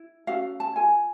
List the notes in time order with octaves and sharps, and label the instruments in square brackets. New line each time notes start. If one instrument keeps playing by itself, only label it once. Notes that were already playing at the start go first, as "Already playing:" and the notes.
Already playing: [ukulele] E4
C#4 F#4 A4 F5
A5
F4 A4 G#5